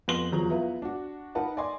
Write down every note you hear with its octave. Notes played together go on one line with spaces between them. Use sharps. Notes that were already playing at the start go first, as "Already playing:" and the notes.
F2 B3 C6 A#6 F#7 G7
E2 F3 F#3 A#5
B3 E4 F4
D4 F#4
D#4 A#4 B4 F#5 A5 B5
D5 D#5 G#5 C6